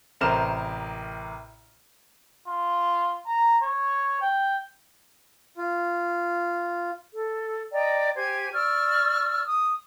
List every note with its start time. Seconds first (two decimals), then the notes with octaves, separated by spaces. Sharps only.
0.21 A1 C3 A#4 C5 F6 E7
2.48 F4
3.27 A#5
3.63 C#5
4.21 G5
5.57 F4
7.13 A4
7.72 D5 D#5 G5 A#5
8.15 G4 C5 G#5 G#6
8.53 D5 C#6 E6 F6
9.44 D#6